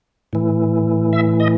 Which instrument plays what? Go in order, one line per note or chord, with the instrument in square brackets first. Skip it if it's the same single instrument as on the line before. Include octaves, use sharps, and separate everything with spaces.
[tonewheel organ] A2 E3
E5
D#5